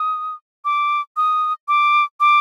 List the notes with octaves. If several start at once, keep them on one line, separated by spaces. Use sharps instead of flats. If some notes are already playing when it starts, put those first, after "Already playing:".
Already playing: D#6
D6
D#6
D6
D6